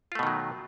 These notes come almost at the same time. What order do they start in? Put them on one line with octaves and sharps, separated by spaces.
F4 A3 B2 D#3 F#3